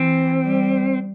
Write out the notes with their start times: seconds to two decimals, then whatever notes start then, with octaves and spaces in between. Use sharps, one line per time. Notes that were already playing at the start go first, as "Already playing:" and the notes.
Already playing: E3 C4
0.42 G3